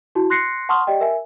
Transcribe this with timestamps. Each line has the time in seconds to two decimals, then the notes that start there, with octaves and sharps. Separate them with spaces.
0.15 E4 F#4 A5
0.30 C6 F#6 A#6 C7 C#7
0.69 F#5 A5 C6 C#6 D#6 F6
0.87 G4 D5 D#5 G5
1.01 A#4 E5 G#5